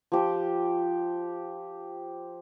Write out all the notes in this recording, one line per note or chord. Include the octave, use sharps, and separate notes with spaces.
F3 G4